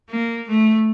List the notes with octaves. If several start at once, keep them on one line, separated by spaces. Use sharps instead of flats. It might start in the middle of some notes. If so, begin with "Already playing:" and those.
A#3
A3